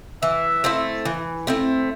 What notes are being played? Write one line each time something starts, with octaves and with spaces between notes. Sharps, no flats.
E3 E5
A3 C4 E4
E3
A3 C4 E4